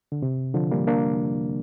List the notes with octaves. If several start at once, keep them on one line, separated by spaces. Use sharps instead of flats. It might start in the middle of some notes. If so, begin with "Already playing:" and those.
D3
C3
D3 F3
G3 A#3
A#3 D4